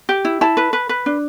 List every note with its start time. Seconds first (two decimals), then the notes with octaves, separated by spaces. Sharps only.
0.09 G4
0.25 E4
0.41 E4 A5
0.57 B4
0.73 B4
0.89 B4
1.06 D4